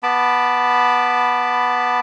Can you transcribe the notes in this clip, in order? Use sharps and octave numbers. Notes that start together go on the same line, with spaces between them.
B3 A5 B5 D6